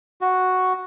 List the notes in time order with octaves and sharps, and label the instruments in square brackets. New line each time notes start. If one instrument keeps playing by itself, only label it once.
[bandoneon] F#4